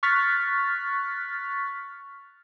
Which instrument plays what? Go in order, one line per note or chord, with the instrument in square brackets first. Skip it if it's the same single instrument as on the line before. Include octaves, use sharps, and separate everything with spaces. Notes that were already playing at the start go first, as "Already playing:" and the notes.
[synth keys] C#6 F6 F#6 A6 B6